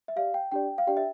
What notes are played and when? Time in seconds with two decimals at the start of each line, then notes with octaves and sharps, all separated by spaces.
0.08 E5
0.16 G4 D5 F5
0.34 G5
0.52 D4 G4 D5 G5
0.78 F5
0.87 D4 G4 D5 G5
0.97 E5